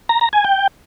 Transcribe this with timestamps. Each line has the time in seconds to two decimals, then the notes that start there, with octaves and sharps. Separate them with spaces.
0.09 A#5
0.21 A#5
0.33 G#5
0.45 G5